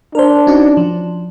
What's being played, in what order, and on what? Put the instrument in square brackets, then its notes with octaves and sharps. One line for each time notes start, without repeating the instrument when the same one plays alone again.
[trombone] D4 [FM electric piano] A#4 C5
[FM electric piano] C#4 D#4 F#4
F3